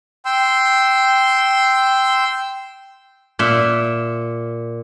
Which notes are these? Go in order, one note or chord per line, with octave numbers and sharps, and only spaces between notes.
G5 C6 E6
A#2 E5